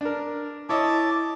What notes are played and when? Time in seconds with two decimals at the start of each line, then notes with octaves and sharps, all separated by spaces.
0.01 D4 A#4
0.69 E4 C#5 D#5 A5 D6